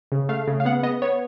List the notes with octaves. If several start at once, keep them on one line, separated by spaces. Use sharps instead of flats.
C#3
A3 F5
C#3
F5
B3 F#5
B3 D#5
B3 C#5